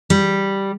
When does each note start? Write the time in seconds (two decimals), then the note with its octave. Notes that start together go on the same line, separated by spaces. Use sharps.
0.10 G3